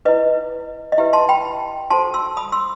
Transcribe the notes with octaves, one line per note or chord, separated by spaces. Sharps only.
E4 B4 D#5
D#5
E4 G4 B4 E5
A5 C6
G5 B5
F#4 A4 C5 A5 C6
C6 E6
B5 D#6
C6 E6